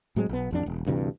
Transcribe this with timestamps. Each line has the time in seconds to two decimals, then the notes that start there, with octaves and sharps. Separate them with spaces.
0.16 A2 F#3 G#3 C4
0.29 B1 B3
0.51 A1 F2 D4
0.66 E1
0.86 D2 G2 C3 E3